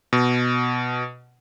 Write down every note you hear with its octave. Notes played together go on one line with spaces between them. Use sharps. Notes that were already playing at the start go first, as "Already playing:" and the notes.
B2